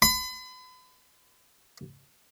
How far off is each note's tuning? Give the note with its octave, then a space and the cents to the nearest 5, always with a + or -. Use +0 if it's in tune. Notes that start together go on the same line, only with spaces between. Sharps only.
B5 +40